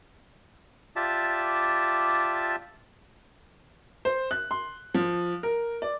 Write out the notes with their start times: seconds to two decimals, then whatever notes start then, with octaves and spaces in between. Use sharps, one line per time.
0.96 F4 G4 D5 E5 A5
4.05 C5
4.31 F#6
4.51 C6
4.94 F3
5.43 A#4
5.82 D5